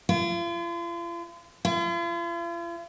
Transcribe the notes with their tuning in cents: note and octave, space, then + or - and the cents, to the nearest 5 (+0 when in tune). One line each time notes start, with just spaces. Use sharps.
F4 -40
F4 -45